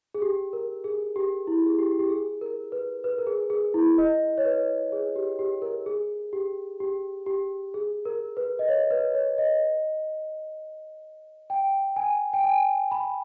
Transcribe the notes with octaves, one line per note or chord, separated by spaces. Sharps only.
G#4
G4
A#4
G#4
G4
E4
G#4
G4
G4
G#4
A#4
B4
B4
A#4
G#4
G#4
E4
D#5
C#5
B4
G#4
G4
G4
A#4
G#4
G4
G4
G4
G#4
A#4
B4
D#5
C#5
B4
C#5
D#5
G5
G#5
G5
G#5
B5